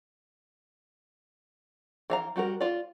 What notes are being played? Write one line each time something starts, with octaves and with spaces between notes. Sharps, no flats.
E3 F5 A#5
G3 F#4 A4 A#4
F4 D5